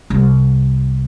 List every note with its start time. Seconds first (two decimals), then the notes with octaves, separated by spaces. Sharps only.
0.10 C2